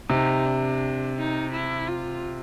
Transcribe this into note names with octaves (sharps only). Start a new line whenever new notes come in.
C3 D#4
D4
D#4
E4
F4